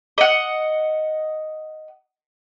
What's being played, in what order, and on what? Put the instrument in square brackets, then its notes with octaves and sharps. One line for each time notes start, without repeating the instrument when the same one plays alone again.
[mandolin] D#5 F#5